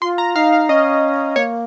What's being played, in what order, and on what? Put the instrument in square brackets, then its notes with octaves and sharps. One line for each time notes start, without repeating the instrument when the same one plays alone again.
[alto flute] F4 [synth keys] C6
[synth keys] A#5
[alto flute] D#4 [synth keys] F5
[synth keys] F5
[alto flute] C#4 [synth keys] D#5
[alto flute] A#3 [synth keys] C#5